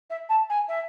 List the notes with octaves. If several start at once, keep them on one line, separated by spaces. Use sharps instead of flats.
E5
A5
G#5
E5